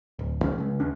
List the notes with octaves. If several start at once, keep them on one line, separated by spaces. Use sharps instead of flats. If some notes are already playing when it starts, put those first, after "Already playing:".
D1
C#2 C#3 F3 C#4
C#3 G#3
D#2 C#4 D4